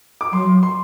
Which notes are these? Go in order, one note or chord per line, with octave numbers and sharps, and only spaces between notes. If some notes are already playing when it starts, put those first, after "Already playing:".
D6
F#3 C6
C6